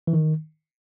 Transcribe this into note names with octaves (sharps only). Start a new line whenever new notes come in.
E3
D#3